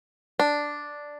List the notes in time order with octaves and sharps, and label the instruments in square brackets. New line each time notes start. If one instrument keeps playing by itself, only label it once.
[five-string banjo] D4